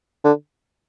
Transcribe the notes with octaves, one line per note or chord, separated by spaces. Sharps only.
D3